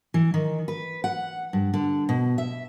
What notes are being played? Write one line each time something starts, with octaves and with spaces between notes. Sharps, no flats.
E3
D#3
B4
F#5
G2
D3
B2
E5